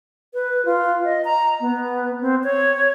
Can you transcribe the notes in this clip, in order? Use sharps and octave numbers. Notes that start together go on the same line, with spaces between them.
B4
F4
D#5
A#5
B3
C4
C#5